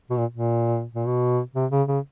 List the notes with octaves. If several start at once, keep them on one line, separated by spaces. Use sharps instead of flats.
B2
A#2
A#2
A#2
B2
C3
C#3
C#3